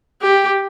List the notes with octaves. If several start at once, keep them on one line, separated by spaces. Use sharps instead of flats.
G4